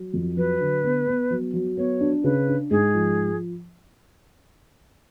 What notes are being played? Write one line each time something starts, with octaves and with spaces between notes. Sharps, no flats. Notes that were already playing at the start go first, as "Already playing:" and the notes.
Already playing: F#3
F2
F#3 B4
D3
B3
B3
F#3
F#3
B3 C#5
D4
C#3 B4
D4
G#2 G#4
F3